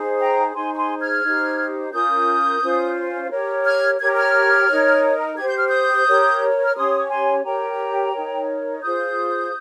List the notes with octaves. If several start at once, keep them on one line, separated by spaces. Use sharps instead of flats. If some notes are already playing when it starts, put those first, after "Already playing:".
Already playing: D#4 G#4 C5
G5 A#5
D#4 G#4 C5 G#5 C6
C#6
G#5 C6
F6 G#6
D#4 G4 C5
C#4 F4 A#4 D#6 G6
C#4 F4 C5
G4 A#4 C#5
F6 G#6
G4 A#4 C#5 G#6
F6 G#6
D#4 A#4 C#5
G4 C5 G#6
G6
F6
D#6 G6
G4 A#4 C#5
F6
C#4 G4 C#5 C6 D#6
C#6
G#5 C6
G4 A#4 C#5 G5 A#5
D#4 A#4 C#5
F4 G#4 C5 D#6 G6